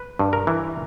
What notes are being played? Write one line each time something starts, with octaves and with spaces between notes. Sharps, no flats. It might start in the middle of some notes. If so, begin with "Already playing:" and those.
Already playing: B4
G2
A#4
E3